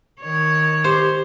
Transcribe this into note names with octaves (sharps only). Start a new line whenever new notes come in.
D#3 C#5
G4 C5